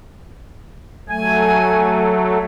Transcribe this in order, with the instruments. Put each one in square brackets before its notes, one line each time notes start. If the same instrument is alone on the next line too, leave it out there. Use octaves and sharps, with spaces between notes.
[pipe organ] F#3 A3 [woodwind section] G#5